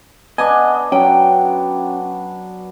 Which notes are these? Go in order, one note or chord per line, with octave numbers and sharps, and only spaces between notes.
B3 D4 D#5 G#5
F#3 C#4 G5